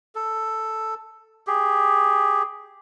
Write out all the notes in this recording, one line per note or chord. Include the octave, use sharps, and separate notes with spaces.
A4
G4 G#4